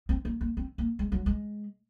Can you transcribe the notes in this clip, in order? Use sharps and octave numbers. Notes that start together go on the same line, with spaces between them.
C4
A#3
A#3
C4
A#3
G#3
F#3
G#3